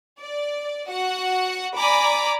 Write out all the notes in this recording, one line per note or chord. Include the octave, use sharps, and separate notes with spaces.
D5
F#4 F#5
D5 G#5 A#5 B5 D6